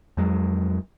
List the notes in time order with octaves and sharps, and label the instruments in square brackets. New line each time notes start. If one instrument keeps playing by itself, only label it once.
[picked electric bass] F2 F#3 G#3